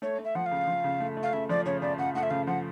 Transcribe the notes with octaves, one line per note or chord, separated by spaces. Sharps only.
A3 C#5
A3
E5
F3 F#5
F5
C#3
F3
C#3
A3
A3
F5
C#3 E5
F3 D5
C#3 C#5
C#3 D5
C#3 F#5
A3 F#5
E5
C#3 F5
F3 F#5